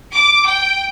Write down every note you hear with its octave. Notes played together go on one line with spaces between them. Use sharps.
D6
G5